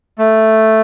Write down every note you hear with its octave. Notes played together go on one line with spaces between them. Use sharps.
A3